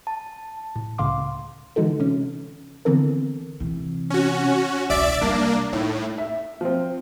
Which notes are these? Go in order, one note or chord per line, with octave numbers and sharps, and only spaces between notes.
A5
A2
C#2 A2 C#3 F5 C6 D6
D3 E3 G#3 D#4 F#4 A4
C3 C#4
D3 E3 B3 C4 A4 A#4
C3 E3
C#4 F#4
E1 C2 D5 E5 D7
C3 G3 A#3 D4
A2 D#4
E5
F3 C4